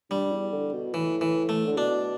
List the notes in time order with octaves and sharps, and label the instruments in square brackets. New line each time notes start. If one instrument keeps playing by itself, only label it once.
[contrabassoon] G2 [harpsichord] G3
[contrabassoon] E2
D3
B2
[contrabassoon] A2 [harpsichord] E3
[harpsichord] E3
A3
[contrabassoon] D3
[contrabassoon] B2 [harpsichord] D4